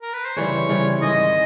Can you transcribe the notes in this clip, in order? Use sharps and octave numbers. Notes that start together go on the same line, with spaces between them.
A#4
B4
C5
C#3 E3 G3 C4 C#5
C#3 E3 G3 C4
G#2 D#3 G#3 D#5